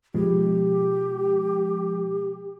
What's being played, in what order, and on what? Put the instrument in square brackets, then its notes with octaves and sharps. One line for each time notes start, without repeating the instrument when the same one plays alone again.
[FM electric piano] B2 F3 G#3 [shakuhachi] G4